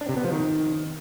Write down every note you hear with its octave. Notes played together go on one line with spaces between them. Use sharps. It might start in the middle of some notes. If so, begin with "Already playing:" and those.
D4
C3
B3
F3
D#3